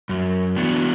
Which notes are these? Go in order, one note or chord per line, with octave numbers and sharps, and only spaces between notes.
F#2
E3 B3 D4 F#4